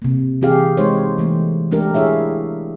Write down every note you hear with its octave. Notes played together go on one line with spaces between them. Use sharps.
C3 A#3
E3 C4 G4 G#4 F5
G#3 D#4 C5 C#5
E3 A3 A#3
G#3 A3 D4 G4 A#4
E4 G#4 C#5 E5 F5